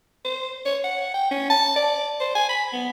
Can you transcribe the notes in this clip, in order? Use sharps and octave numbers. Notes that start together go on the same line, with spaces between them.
C5
C#5
F#5
G5
C#4
A5
D5
C5
G#5
B5
B3